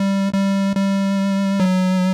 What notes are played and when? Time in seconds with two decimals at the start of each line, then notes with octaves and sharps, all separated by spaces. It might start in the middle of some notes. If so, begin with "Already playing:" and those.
Already playing: G3
0.33 G3
0.76 G3
1.60 F#3